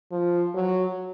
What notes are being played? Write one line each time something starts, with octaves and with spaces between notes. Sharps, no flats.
F3
F#3